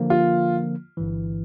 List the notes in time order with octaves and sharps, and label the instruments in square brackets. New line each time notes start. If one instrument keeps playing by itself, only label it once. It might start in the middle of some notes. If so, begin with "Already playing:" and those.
Already playing: [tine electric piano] D3 F3 A#3
[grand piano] F4
[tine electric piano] G1 G2 E3